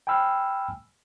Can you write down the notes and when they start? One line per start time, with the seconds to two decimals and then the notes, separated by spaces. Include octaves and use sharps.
0.07 G5 G#5 B5 E6 F6